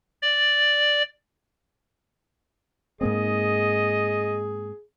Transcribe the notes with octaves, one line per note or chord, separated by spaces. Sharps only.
D5
G#2 A#3 C4 G#4 D#5